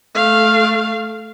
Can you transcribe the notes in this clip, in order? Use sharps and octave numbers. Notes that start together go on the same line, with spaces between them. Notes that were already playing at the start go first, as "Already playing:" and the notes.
A3 F5